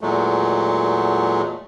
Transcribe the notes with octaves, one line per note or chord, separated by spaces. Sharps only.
E2 A#2 F#3 G#3 A3